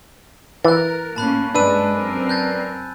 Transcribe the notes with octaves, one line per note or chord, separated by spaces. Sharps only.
E3 A#4 F#6 A6
A2 A#3 C#4 A5 B5 F#6
G2 G#3 D4 B4 G#5 E6 D#7
F#2 C4 A#4
F#6 G6 A6